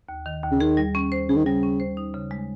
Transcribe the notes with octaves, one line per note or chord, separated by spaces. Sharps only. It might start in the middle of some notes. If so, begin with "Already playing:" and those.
D#2
D#3
D#2
C#3
D#3 G#4
G3
C#4
C5
C#3 G#4
D#3
C#3 G3
C#4
C5
D#4
C#3
G#3